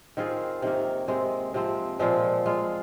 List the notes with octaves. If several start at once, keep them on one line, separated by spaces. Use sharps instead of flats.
D#3 C4 F4 G#4
C3 D#3 A#3
C3 G#3 C4
C3 F3 C4
A#2 F3 G#3 C4
G#3 F4 G#4